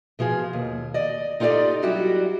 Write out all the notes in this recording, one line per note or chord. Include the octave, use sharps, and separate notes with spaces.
B2 F3 F4 G#4
D#2
D5 D#5
D#4 F4 G4 A4 D5 D#5
F#3 G3 E4 F#4 G4